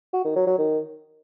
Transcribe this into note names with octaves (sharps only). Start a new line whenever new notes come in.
F#4
D#3
F#3
F#3
D#3